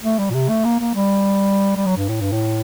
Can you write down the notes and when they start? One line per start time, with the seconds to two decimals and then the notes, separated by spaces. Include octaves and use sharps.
0.03 A3
0.19 G3
0.30 A#2
0.34 C3
0.49 A3
0.65 A#3
0.80 A#3
0.95 G3
1.77 G3
1.86 F#3
1.97 G2
2.09 A2
2.21 G2
2.32 A2